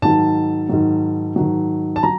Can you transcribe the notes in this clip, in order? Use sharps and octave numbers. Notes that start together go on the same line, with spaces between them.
G#2 D#3 F#3 A5
G#2 D#3 F#3
G#2 D#3 F#3
A5
F#3 A#5